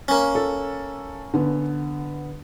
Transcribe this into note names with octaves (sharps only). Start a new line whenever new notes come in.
A#3 C#4
A4
D3 B3